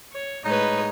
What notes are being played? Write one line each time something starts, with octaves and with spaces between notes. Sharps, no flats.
C#5
A2 G#3 D#4 B4 C#5 D#5